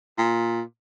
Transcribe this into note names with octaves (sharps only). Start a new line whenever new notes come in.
A#2